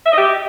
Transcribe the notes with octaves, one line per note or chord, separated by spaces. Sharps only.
E5
D#5
G4